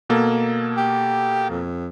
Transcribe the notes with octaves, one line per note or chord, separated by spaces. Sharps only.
B2 A#3 A4
G4
F2